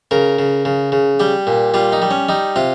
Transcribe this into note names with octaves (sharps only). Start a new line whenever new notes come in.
C#3 A#4
C#3
C#3
C#3
G3 G4
A#2
G3 F4
D#4
G3
C#4
G3 D#4
C3 F4